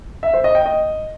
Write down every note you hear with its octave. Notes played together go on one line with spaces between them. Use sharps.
E5
C5
D#5
G5
D#5